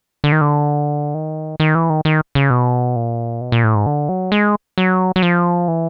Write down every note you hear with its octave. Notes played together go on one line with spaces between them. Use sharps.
D3
D#3
D3
D#3
D#3
E3
D#3
D#3
C#3
B2
A#2
B2
A#2
A2
G#2
D3
F#3
G#3
F#3
F#3
F3
E3